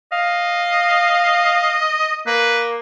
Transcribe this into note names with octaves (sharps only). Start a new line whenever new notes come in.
D#5 F5
A#3 B4